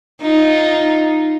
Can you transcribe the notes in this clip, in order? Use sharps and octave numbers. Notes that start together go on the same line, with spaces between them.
D#4 F4